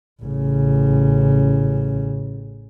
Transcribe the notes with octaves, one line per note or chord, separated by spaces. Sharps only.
A1 C#3